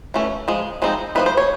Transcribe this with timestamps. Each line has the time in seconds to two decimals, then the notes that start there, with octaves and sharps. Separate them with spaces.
0.14 E3 A3 C#4
0.48 F3 G#3
0.82 F3 G#3 C4 D#4
1.15 F3 A3 C4 D#4 B4
1.26 C5
1.37 C#5